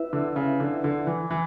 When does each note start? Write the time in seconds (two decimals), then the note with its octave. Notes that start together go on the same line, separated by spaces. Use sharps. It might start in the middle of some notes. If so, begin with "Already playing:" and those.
Already playing: E4 B4 E5
0.13 D3
0.36 C#3
0.60 D3
0.84 D3
1.07 E3
1.31 E3